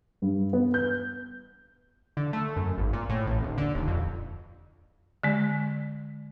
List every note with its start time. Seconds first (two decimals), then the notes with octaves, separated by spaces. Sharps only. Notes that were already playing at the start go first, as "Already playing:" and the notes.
0.22 G2
0.53 B3
0.74 G6
2.17 D3
2.33 A3
2.57 F#2
2.78 G#1
2.93 A#2
3.09 A2
3.27 A1
3.43 D#1
3.58 D3
3.75 D#1
3.88 F2
5.23 D3 G#3